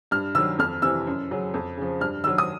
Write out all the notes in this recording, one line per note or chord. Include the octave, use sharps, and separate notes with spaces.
G2 F6
D#3 F#3 E6
F2 F6
C3 E3 E6
F#2
C#3 F#3
F2
C#3 F3
G2 F6
D#3 F#3 E6
D#6